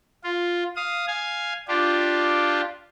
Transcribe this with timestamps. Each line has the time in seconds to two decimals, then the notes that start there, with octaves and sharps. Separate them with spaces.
0.24 F4
0.76 F5 D#6
1.07 F5 G#5
1.68 D4 F4 G4